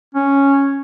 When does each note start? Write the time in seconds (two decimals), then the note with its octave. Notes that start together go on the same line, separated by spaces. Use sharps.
0.15 C#4